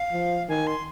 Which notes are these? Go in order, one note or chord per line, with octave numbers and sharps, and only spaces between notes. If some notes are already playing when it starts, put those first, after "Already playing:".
Already playing: F5
F3
D#3 G#5
C6